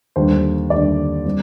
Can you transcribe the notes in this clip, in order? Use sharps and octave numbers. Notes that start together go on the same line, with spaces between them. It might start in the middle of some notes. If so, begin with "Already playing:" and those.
D#2 D3 G3 C5
D#2 D3 G3 D5
G3 C4